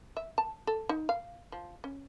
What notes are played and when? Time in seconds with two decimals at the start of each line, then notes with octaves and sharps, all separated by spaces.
0.17 E5
0.38 A5
0.67 A4
0.89 D#4
1.09 F5
1.52 F3
1.84 C#4